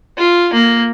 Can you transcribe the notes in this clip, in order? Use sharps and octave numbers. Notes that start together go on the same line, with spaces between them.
F4
A#3